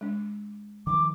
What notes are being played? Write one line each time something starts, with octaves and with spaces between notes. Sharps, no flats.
G#3 D4
D#3 F3 D6